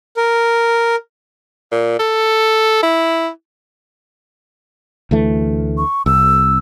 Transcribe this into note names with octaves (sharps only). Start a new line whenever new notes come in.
A#4
A#2
A4
E4
D2 E3 A3
C#6
C2 E6